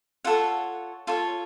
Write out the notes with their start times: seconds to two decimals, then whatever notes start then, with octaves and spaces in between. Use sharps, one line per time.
0.25 F4 A4 C#5 F#5
1.07 F4 A4 C#5